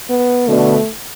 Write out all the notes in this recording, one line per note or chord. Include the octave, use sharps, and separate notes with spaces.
B3
B2 D3 A3